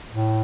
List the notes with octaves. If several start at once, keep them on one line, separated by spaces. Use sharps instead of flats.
A2